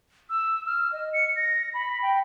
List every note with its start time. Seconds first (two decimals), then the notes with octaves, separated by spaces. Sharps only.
0.30 E6
0.67 F6
0.93 D#5
1.13 C#7
1.36 A#6
1.74 B5
2.02 G5